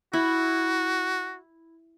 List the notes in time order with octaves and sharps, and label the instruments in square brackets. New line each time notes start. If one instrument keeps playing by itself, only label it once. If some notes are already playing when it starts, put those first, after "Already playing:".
[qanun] E4 [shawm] F#4